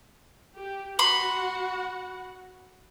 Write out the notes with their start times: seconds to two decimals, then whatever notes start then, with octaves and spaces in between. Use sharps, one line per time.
0.56 G4
0.99 F#4 F#5 B5 C6